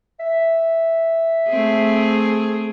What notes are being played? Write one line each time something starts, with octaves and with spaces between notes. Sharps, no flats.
E5
A3 C4 G#4